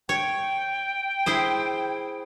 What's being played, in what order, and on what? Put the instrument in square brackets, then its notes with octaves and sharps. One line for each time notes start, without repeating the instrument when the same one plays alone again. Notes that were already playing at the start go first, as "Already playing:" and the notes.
[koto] C#5 [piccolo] G5
[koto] E4 G#4 C5